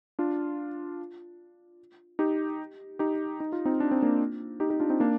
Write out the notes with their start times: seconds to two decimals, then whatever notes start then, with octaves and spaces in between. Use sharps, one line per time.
0.19 D4 F4
2.19 D#4 G4
2.99 D#4 G4
3.40 D#4
3.53 F4
3.65 C4 D#4
3.80 D4
3.91 C4
4.02 A#3 D4
4.60 D#4 G4
4.70 D#4 G4
4.80 D4 F4
4.90 C4 D#4
5.00 A#3 D4